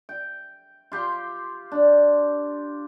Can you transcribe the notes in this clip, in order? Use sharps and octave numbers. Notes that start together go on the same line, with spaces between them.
G5
F4 G4 C6
D4